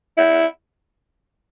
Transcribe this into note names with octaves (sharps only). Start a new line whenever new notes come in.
E4